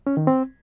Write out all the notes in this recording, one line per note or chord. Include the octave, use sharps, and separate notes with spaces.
C#4
D#3
C4